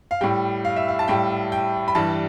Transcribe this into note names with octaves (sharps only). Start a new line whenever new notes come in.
F5
A2 G3 G5
F5
E5
F5
A5
A2 G3 G5
G5
B5
G2 E3 G3 A5